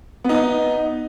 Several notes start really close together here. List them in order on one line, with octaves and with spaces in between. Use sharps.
B3 D#4 D#5